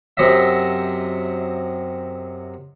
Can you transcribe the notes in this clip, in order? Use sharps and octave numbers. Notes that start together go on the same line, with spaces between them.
F#2 C3 F#3 D#5 E5